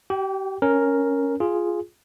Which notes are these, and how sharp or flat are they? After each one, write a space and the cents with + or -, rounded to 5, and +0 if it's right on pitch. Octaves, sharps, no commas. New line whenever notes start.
G4 -35 G5 +5
C#4 +0 A#4 +0
F4 +0 G#4 +0